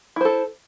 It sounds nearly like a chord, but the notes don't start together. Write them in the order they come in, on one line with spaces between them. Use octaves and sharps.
E4 C5 A4